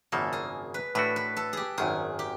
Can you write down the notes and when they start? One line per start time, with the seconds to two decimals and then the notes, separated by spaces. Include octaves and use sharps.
0.12 G#1 F#2 C#3 F3 A#3 A4
0.33 G#4
0.74 B4
0.95 A2 E3 A3 D4 F#4 B4
1.16 B4
1.36 A4
1.53 G4 G#4
1.78 G#1 F#2 D#3 G#4
2.19 G4